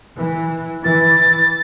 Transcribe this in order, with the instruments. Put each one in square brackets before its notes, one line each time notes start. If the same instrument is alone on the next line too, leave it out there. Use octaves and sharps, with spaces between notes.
[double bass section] E3
[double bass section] E3 [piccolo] A6